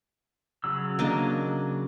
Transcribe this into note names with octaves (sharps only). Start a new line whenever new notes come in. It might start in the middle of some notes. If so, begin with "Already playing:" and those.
C#3 F#3 E6
A#3 D4 D#5